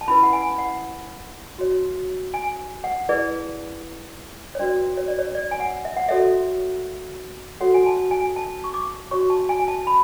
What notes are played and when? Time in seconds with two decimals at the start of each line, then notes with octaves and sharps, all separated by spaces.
0.01 A5
0.08 C#4 E4 B4 B5
0.23 F#5
0.33 G#5
0.58 F#5
1.59 F#4 C#5
2.34 G#5
2.84 F#5
3.09 E4 G#4 B4 D5
4.55 C#5
4.59 D4 F#4 B4 D5
4.97 C#5
5.08 D5
5.19 C#5
5.35 D5
5.51 G#5
5.60 F#5
5.85 E5
5.97 F#5
6.09 F#4 A4 C#5 E5
7.61 F#4 A4 C#5 F#5
7.74 G#5
7.86 A5
8.11 G#5
8.36 A5
8.64 C#6
8.74 D6
9.11 F#4 C#5 C#6
9.30 A5
9.49 G#5
9.68 A5
9.87 B5